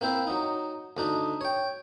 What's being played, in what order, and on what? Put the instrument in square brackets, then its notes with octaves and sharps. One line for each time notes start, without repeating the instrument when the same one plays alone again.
[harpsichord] A#3 C4 E4 C5 E5
F#3 D#4
D2 D4 D#4
C#5 G5